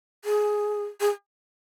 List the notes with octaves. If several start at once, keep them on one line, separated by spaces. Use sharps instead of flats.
G#4
G#4